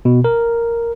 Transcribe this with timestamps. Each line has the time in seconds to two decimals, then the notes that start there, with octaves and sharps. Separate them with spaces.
0.05 B2
0.24 A#4